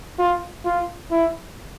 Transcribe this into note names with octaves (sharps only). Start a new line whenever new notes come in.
F4
F4
E4